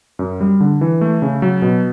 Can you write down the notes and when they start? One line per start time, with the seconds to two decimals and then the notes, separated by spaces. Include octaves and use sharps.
0.19 F#2
0.40 G3
0.60 D3
0.81 E3
1.01 A3
1.22 C#3
1.42 F#3
1.62 B2